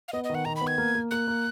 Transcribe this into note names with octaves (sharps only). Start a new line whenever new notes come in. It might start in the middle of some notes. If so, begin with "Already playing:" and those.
F5
B3 D#5
D#5
D#3
F#5
D#3 A#5
B5
B3
G#6
A#3
A#3
A#3 F#6
A#3